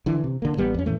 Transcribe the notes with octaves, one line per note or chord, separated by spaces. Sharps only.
D3 E3
C3
D3 A#3
A1 G3 B3
F2 C#4
A2 E3 A3